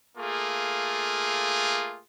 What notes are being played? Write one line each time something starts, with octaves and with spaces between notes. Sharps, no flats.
A3 A#3 F4 G#4